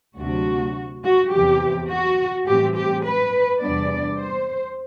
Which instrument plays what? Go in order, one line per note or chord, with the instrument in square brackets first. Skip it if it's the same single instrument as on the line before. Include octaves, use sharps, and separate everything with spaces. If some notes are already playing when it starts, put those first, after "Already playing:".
[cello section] D2 C3 F#3 A3 D4 F#4
F#4
E2 C3 E3 G4
F#4
A2 E3 G3 C4 G4
G4
B4
E2 C3 G3 B3 D4 D5
C5